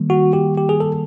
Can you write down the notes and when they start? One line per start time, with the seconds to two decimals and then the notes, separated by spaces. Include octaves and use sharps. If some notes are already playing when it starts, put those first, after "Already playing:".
Already playing: D#3 G3 A#3
0.10 F#4
0.33 G4
0.57 G4
0.69 G#4
0.80 A4